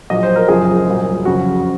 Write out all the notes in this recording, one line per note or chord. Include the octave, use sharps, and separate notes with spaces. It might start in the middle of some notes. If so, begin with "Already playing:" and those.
A#1 A#2 F#3 D#5
C5
A#4
F#1 F#2 C#3 F3 G#4
C2 A#2 F#3
F2 C#3 F#3 F#4